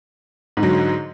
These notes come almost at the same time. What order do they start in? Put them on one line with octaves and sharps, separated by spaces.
G#2 D3 F#3